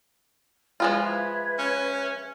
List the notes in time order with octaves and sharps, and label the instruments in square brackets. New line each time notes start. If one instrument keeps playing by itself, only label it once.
[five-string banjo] F3 G#3 F4 [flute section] B4 E5 G#6
[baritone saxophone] C#4